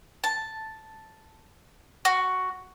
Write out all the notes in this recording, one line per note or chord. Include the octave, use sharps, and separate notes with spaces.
A5
F#4